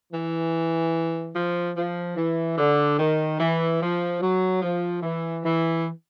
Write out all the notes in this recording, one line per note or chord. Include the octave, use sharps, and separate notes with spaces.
E3
F3
F3
E3
D3
D#3
E3
F3
F#3
F3
E3
E3